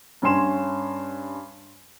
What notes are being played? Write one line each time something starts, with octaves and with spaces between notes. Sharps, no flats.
G2 C#4 G#5 C6 E7